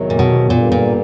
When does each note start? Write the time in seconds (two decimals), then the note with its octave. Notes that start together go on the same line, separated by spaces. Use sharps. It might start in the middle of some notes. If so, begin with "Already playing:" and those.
Already playing: E2 C3 D#3 F#3
0.10 A#2
0.19 B2
0.50 G2 A#2 D3 G3 A#3
0.72 A#2